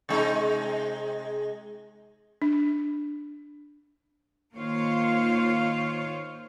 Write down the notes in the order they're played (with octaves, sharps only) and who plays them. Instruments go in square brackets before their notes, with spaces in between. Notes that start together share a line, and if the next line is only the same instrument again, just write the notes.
[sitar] C3 G#3 D#4
[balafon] D4
[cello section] D#3 A#3 F4 C5 C#5 F5